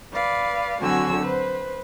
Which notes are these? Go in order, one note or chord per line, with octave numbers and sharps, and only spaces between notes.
B4 D5 F5
D3 F#3 C4 F#4 G#5 E6
B4 C5